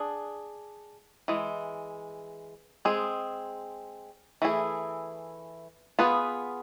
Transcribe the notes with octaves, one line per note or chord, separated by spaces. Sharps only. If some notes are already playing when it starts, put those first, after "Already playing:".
Already playing: D4 G#4
E3 G#3
G#3 C4 G#4
E3 A3 E4 G#4
B3 F4 G#4 B4